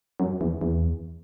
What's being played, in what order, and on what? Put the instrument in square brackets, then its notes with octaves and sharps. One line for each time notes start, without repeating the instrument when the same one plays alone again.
[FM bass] F#2
E2
E2